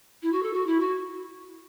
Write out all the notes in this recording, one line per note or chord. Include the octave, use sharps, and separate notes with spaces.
E4
F#4
A4
F#4
E4
F#4